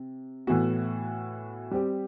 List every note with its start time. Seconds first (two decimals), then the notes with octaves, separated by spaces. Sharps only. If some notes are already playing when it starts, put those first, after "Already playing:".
Already playing: C3
0.47 A2 E3 B3 F#4
1.71 G3 C4 G4